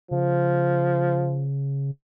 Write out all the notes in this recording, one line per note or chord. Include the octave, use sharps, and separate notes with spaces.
C#3 F3